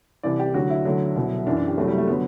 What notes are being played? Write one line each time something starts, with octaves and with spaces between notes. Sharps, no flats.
C2 C3 E3 D5
G4
D2 D3 F#3 F#4
E4
D2 D3 F#3
C2 B2 F#3
F#2 E3 D4
D4
G4
C2 C3 F#3 A3
G3
A3
D3 F#3 B3